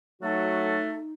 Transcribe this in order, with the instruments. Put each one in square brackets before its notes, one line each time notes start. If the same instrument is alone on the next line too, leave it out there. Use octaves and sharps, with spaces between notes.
[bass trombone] F#3 [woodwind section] A3 F#4 A4 [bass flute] D#4